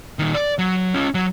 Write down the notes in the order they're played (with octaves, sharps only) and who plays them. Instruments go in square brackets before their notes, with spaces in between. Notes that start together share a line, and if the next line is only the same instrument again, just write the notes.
[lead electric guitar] A#2 D#3
D5
F#3
C#4 F4
F#3